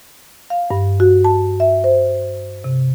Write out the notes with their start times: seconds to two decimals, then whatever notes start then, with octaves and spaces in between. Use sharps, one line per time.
0.50 F5
0.71 G2
1.00 F#4
1.24 A5
1.60 E5
1.84 C5
2.64 C3